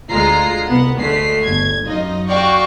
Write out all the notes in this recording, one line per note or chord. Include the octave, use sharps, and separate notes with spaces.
D2 G#3 F4 A#5 C7
C2 B3 F#5
D2 D3 G#3 A3 B6 C7
G1 G#6
F#2 D#4 F4 D#5
F#4 D5 F5 G5 C#6